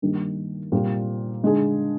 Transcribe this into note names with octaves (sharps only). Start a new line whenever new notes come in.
G2 D#3 G3 A#3
A#2 G3 C4
D3 G#3 D#4 G#4